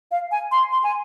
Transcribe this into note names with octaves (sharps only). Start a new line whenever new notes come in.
F5
G#5
C6
C6
G#5